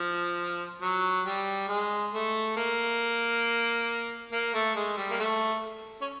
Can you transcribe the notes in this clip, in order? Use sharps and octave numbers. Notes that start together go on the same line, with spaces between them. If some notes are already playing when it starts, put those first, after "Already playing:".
Already playing: F3
F#3
G3
G#3
A3
A#3
A#3
A3
G#3
G3
A#3
A3
C#4